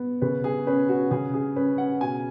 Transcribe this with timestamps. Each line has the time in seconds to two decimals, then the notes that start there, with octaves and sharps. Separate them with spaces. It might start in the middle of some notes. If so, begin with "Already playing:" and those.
Already playing: B3
0.22 C#3 B4
0.44 G#4
0.67 C#4 B4
0.89 F#4
1.11 C#3 G#4
1.34 G#4
1.56 C#4 B4
1.78 F#5
2.01 B2 G#5